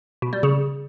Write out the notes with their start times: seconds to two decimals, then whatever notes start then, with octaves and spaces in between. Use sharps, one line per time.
0.22 B2
0.33 G3
0.43 C#3